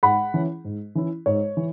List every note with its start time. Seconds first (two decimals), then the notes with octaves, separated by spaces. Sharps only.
0.03 G#2 F#5 B5
0.34 E3 C#4 E4
0.64 G#2
0.95 E3 C#4 E4
1.26 G#2 C#5
1.57 E3